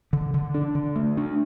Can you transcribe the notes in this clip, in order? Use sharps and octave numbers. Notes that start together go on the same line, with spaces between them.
D3
D3
D4
D3
A3
D4